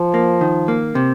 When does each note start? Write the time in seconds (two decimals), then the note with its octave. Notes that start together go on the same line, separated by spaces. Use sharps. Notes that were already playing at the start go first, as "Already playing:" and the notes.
Already playing: F3
0.14 A#3
0.41 D#3
0.68 A#3
0.95 C3